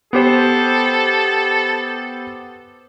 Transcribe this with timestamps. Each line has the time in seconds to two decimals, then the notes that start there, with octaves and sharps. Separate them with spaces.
0.13 B3 G4 A4 C5